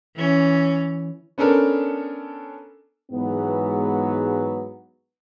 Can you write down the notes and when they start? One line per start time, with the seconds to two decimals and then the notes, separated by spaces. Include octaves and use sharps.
0.15 E3 C#4
1.38 B3 C#4 D4 A4 A#4
3.12 G#2 E3 F#3 G#3 B3